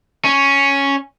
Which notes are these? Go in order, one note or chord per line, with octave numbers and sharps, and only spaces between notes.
C#4